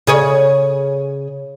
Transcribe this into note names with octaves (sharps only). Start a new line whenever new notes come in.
C#3 G#4 C#5